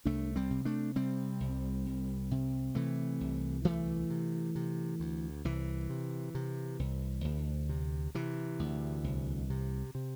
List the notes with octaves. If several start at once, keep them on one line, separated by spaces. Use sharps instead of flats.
C2 A3 D4
G3 C4
C3
A3 D4
C3 G3 C4
C2
C2
C3
C3 E3 A3
C2
D2 E3 A3
C3
C3
D2
C2 E3
C3
C3
C2
D2
C3
C3 E3
D2
C2
C3
C3